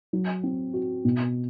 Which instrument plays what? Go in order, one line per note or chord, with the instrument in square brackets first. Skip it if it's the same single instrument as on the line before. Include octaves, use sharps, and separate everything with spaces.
[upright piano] F#3
C4
F#4
B2